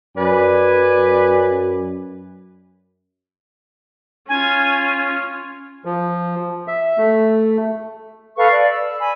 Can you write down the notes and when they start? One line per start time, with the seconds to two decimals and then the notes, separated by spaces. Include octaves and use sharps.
0.17 F#2 B4 D5 G#5
4.29 C#4 F4 G#5
5.85 F3
6.68 E5
6.97 A3
8.36 A4 B4 F5 C#6
8.50 D5
8.69 E6
8.99 G#5 B5